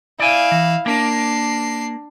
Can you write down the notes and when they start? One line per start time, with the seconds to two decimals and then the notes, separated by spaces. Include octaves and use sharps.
0.19 E4 D5 F5 G#5
0.52 E3
0.86 A#3 D4 A#4 C7